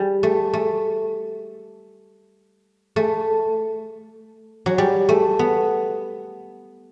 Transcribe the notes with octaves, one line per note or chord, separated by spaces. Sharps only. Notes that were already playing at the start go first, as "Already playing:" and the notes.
Already playing: G3
A3
A3
A3
F#3
G3
A3
B3